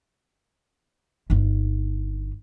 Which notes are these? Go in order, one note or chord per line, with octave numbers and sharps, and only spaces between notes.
G1 D#4